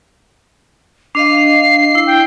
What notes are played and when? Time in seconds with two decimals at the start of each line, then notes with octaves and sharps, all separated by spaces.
1.15 D4 D#5 F5 C7
1.95 E4
2.07 G5